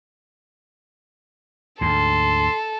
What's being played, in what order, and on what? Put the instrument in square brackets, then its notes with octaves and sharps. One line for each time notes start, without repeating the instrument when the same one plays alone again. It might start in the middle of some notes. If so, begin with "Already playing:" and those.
[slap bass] D2 G#2 [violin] A4 [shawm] C6